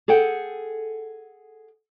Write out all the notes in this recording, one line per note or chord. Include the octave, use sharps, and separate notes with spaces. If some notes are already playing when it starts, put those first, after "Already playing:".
G#4 A4 F#5 G5